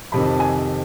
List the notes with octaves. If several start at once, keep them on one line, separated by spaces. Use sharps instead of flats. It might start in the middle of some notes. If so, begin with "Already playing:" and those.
F2 C3 D#3 B5
A5
G#5